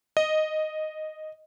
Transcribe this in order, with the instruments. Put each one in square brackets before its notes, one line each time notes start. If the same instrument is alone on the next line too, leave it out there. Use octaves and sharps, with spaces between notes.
[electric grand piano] D#5